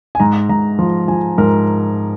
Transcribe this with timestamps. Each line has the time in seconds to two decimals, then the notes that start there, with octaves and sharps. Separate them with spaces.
0.15 G#5
0.20 G#2 A#5
0.49 G#2 A#5
0.79 F3
1.08 F3 G#5
1.38 G#2 A#4